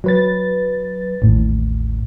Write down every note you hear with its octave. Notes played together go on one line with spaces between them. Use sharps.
F#3 B4 A6
A1 D#2 A2